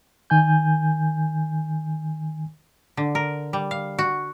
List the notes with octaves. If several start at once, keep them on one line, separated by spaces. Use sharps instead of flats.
D#3 G#5 G6
D3
A#4
G3
F5
F#4